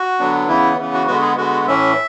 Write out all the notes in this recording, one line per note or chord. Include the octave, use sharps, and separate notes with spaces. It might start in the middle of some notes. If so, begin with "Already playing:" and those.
Already playing: F#4
D3 F#3 B3 D4
C#3 E3 B3 E4
C#3 E3 B3
F#4
D3 G#3 B3 F#4
G#4
D3 G#3 B3 F#4
A2 E3 A3 C#4 E5